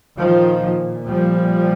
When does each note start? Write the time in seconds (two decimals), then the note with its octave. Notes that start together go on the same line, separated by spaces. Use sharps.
0.18 A#2 D#3 F3
1.07 F3 G3